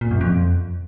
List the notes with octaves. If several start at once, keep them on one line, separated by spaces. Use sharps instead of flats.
A#2
F#2
F2